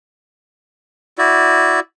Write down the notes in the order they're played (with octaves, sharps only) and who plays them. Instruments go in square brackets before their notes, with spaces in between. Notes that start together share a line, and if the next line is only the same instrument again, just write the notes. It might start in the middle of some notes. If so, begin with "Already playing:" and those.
[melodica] E4 F#4 D5